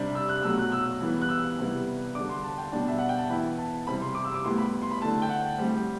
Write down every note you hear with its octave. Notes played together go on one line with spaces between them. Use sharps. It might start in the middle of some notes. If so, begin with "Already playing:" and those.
Already playing: C3 G3 D4
E6
F#6
B2 F#3 A3 E6
F#6
E6
E3 G3 B3
F#6
E6
C3 G3 B3 E4
D3 G3 D4 D6
C6
A5
G5
B2 G3 D4 A5
E5
F#5
G5
A5
E3 B3 E4 B5
A5
C3 G3 C4 E4 B5
C6
D6
E6
D6
A2 G3 B3 E4 C6
B5
C6
B5
D3 A3 E4 A5
G5
F#5
A2 G3 C4